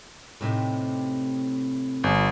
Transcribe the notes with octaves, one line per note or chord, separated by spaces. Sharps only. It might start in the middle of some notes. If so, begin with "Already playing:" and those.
A2 C3 D#4
G1